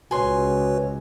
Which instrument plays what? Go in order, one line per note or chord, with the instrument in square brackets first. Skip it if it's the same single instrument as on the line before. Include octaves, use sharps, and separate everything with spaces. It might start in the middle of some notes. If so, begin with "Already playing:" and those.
[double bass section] C#2 [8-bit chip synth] F#4 B4 C#5 [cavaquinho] G#5 C6